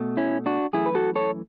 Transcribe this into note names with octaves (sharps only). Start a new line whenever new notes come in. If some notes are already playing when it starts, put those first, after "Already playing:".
Already playing: B2 A3
C#4 E4
D4 F#4
F#2 E3 A3 E4 G#4
B4
F#4 A4
A4 C#5